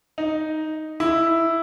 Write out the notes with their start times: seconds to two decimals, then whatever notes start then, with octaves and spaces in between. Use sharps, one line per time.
0.18 D#4
1.00 E4